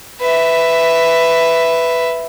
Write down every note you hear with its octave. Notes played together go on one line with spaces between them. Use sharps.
B4 E5